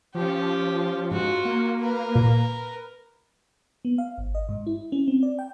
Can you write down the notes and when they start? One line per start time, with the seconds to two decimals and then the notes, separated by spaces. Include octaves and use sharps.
0.15 F3 C#4 G4
1.11 G#2 F4 F#4
1.45 A#3
1.81 A#4 B4
2.15 A#2
3.85 B3
3.98 F5
4.18 G#1
4.35 D#5
4.49 G#2
4.67 E4
4.92 C#4
5.08 C4
5.23 D5
5.39 G5